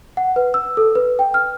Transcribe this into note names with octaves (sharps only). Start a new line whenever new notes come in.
F#5
B4
E6
A4
B4
G5
F6